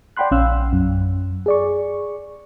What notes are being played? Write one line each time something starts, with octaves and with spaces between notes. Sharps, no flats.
D5 F#5 G5 B5 C6 F#6
A#1 C#4 F5 E6 F#6
F#2
G#4 D5 C#6